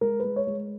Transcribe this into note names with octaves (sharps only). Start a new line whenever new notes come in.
G#3 A#4
G#3 B4
C#5
G#3